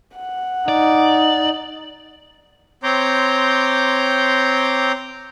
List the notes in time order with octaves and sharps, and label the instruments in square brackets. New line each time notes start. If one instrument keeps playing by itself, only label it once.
[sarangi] F#5
[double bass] D#4 [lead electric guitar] D5
[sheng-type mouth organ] C4 C#5 A#5 C6 D6 G6